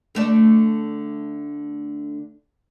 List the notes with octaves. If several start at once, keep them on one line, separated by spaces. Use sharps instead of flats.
D3 A3 D5